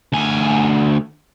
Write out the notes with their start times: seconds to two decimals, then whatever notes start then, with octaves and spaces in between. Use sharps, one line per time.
0.13 D2 G#5